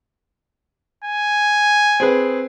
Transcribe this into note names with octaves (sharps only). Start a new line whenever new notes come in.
G#5
C4 G#4 B4